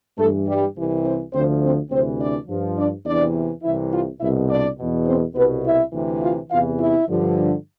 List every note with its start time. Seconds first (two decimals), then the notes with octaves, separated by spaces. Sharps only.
0.18 G2 E3 A3 A4
0.47 G3 G4
0.76 C2 C3 E3
1.04 C4 C5
1.33 D2 D3 F3 C4 C5
1.62 C4 C5
1.90 D2 C3 E3 C4 C5
2.19 D4 D5
2.47 G2 F3
2.77 D4 D5
3.05 E2 C3 E3 D4 D5
3.63 C2 C3 E3 E4 E5
3.92 F4 F5
4.20 C2 B2 E4 E5
4.49 D4 D5
4.78 E2 B2
5.06 C4 C5
5.35 C2 B2 B3 B4
5.64 E4 E5
5.92 D2 C3 E3
6.21 F4 F5
6.50 E2 C3 E3 F4 F5
6.78 E4 E5
7.07 G2 D3 F3